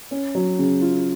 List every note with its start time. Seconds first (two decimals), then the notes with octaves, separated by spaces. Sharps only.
0.11 C#4
0.35 F#3
0.59 C#3
0.81 F4